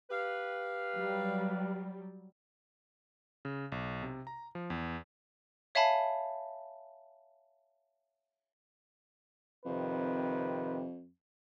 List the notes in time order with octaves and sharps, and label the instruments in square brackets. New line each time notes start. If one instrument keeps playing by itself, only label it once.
[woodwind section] G4 B4 F5
[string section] F#3 G3
[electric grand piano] C#3
B1
C3
A#5
F3
E2
[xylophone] C#5 E5 F5 G#5 A5 B5
[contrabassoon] F2 [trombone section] C3 D#3 B4